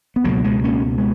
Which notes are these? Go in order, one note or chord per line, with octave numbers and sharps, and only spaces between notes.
B3
C#2 B2 F#3 A#3
G#3 B3
A#3 C#4
G#3 B3